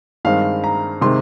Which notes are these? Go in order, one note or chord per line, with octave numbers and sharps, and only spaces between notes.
G2 D#3 G#3 C4 F5
A#5
C3 D#3 G#3 C4 C6